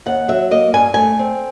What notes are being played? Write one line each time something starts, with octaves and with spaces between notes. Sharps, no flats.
D#2 F#5
F#3 E5
A#3 D#5
G2 G#5
A3 G#5
C4